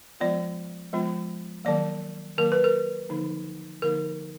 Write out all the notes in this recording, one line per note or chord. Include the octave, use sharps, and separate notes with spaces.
F3 G#3 B3 F4 D5
F3 G#3 B3 F4
D#3 F#3 A#3 D5
D#3 F#3 A#3 A#4
B4
A#4
D3 F3 A#3 D#4
D3 F3 A#3 D#4 A#4